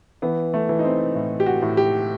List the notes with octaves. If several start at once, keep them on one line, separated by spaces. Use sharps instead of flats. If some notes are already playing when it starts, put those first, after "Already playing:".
E3 B3
A3
E3
D#4
C4
A2
G4
F#4
A2
G4